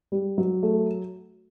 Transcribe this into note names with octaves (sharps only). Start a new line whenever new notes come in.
G3
F#3
A3